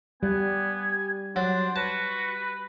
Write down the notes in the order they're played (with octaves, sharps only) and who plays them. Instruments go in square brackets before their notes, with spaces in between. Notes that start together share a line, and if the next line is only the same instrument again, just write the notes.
[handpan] G3 [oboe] B3 [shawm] G#5
[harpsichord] F#3 [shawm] D4 [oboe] C5
[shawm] F#4 [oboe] B4 [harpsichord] A5